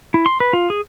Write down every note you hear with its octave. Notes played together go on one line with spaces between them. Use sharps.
E4
C6
B4
F4
G#4